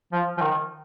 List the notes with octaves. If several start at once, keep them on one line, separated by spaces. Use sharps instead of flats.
F3
F3
D#3